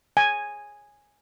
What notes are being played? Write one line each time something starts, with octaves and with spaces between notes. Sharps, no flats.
G#5